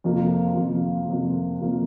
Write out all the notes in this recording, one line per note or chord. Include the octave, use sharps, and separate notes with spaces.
F2 C3 F3 A#3 F4
F2 C3 F3 A#3 F4
F2 C3 F3 A#3 F4
C3 F3 A#3 F4